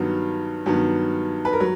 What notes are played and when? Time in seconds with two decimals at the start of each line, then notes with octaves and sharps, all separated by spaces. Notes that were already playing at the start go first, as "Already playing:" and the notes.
Already playing: G2 D#3 F#3 B3
0.66 G2 D#3 F#3 B3
1.45 B4
1.53 A#4
1.60 F#3